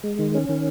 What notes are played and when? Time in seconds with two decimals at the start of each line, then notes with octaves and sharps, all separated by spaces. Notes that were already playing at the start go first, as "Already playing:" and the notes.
0.04 G#3
0.19 D#3
0.34 C#4
0.49 D#3